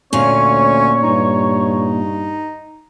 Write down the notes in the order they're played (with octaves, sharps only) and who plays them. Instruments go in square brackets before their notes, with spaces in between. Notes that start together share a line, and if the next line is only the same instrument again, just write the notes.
[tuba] D2 [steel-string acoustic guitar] A#2 F5 [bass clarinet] C#4 [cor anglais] C#5
[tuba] G2 [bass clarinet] D#4